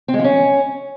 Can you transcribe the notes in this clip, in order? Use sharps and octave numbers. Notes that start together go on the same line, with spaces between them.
C4
G#3
F3
C#4